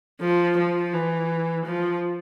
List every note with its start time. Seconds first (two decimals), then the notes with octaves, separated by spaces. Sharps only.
0.21 F3
0.57 F3
0.93 E3
1.65 F3